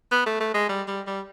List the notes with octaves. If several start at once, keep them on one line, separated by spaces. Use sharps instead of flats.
B3
A3
A3
G#3
G3
G3
G3